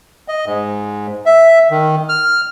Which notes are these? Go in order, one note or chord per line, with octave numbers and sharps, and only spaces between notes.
D#5
G#2
E5
D#3
F6